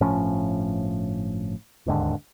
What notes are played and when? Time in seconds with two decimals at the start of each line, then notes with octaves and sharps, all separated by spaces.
0.01 G1 A2 F3 C#4
1.86 D1 D#2 G#2 D3